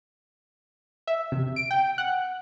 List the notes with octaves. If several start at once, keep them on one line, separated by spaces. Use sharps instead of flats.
E5
C3
D7
G5
F#5